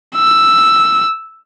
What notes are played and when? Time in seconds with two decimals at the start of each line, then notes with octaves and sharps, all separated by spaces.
0.16 E6